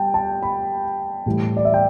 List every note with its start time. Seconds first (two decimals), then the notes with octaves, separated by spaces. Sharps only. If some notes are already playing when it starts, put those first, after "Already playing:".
Already playing: G3 G5 A5
0.14 A5
0.43 B5
1.26 A2 E3 G3
1.57 D5
1.65 E5
1.74 G5